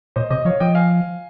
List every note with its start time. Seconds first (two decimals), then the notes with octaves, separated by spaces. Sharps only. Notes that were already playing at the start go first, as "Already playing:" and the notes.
0.16 A#2 C5 D#5
0.30 C3 C5 D#5
0.45 F3 C#5 F5
0.60 F3 D#5 G5
0.75 F5 G#5